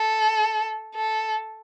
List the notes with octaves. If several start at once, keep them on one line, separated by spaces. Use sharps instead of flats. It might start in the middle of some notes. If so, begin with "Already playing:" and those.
Already playing: A4
A4